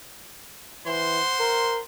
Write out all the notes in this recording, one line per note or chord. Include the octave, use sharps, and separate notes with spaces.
E3 C5 F#5 C6
A#4